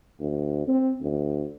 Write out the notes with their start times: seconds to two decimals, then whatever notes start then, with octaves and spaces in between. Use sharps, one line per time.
0.20 D2
0.68 C4
1.02 D2